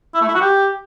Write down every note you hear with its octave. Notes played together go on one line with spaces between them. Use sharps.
E4
A3
E4
F#4
G4